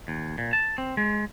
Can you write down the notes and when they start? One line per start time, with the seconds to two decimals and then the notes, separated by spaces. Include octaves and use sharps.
0.08 D#2
0.38 A#2
0.53 A5
0.78 C4
0.97 G#3